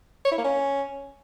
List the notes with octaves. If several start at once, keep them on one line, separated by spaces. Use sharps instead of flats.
C#5
E4
A#3
C#4